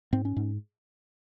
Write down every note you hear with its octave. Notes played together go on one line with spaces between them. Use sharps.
G#2 C4
C#4
G#2